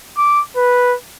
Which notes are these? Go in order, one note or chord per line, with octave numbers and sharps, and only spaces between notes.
D6
B4